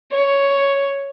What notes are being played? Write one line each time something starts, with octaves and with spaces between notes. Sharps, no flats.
C#5